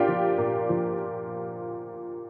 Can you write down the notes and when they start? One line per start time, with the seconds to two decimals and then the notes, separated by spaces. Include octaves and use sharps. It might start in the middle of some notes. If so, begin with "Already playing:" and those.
Already playing: A#2 D4 F4 G4
0.08 F3
0.38 A#2
0.69 F3